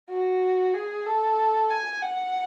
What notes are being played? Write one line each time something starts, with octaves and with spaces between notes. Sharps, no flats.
F#4
G#4
A4
G#5
F#5